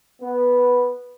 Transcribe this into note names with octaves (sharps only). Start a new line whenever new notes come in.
B3